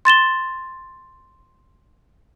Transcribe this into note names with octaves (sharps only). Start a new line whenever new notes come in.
C6 A6 E7 G7